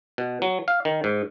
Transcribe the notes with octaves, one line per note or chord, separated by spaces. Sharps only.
B2
F#3
F5
D#3
G#2